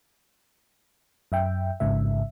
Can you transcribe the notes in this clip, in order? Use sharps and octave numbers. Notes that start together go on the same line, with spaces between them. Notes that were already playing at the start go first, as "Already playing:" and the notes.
F#2 E5 G5
A1 G#2 C#3 E5